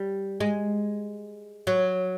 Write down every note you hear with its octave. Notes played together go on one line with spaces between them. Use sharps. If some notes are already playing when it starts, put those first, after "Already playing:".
Already playing: G3
G#3
F#3